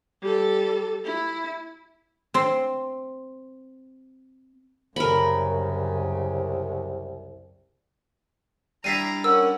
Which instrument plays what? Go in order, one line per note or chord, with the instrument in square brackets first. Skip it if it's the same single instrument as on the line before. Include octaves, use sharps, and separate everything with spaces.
[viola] G3 A4
E4
[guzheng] C4 C6
[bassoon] C2 [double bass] F#2 C#3 [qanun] A#4 B5
[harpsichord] G3 D4 E4 [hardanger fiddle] A#5 D6 [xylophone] B6 C7 D#7
[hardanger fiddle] C#4 F#5 [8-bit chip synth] A#4 [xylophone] E6